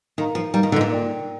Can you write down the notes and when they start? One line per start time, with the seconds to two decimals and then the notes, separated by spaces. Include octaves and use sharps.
0.18 D#3 D#4 A#4 F5 A#5
0.35 F3
0.54 G3 D#4 A#4 F5 A#5
0.63 D#3
0.72 D3
0.76 G#2
0.81 A#2
0.90 A#4 D5 G5